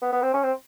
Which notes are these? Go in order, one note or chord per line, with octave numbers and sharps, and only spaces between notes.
B3
B3
C4
C#4
C4